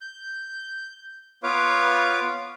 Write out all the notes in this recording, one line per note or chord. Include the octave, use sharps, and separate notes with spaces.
G6
B3 F4 B4 C#5 F5 D6